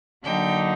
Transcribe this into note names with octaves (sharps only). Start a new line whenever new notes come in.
D3 F#3 A#3 D#4 G5